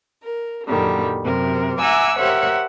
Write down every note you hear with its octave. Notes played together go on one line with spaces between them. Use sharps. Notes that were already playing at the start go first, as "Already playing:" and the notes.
A#4
F#2 A#2 D3 D#3 G3
F#2 C3 A#4
E5 F#5 G#5 A#5 D6 E6
G4 A#4 C5 C#5 E5 F#5